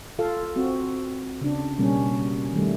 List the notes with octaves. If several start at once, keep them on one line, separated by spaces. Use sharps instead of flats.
F4 A4 F5
C4 F#4
C#3 D4
B2 G3 A#3 C#4
D#3 G3 A3